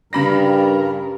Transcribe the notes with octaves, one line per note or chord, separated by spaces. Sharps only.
G2 C#3 G3 A#4 B5 A#6